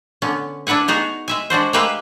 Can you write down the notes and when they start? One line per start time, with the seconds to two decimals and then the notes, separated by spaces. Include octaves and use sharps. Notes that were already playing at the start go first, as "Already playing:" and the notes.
0.22 D3 B3 C#4
0.67 D4 E4 B4 F#5 G#5
0.88 B3 D#4 F#4 G#4
1.28 G#3 E5 G#5
1.50 G#3 D4 F#4 C5
1.73 G#3 A#3 G4 B4 E5 F5